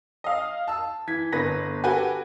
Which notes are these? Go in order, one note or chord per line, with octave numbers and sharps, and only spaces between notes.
D#5 F5
A5 E6
E3 G#6 B6
G1 D3 B4 A#6
F#4 G4 A4 B4 G5 G#5